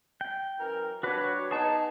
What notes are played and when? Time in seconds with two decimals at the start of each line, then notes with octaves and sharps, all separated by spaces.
0.21 G5
0.59 F#2 E3 A#4
1.03 G2 D4 F#4 B4 C#5
1.51 B3 D#4 G#4 A5